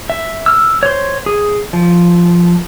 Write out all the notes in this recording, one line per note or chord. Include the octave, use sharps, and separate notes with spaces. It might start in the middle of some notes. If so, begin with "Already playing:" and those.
E5
E6 F6
C5 C#5
G#4
F3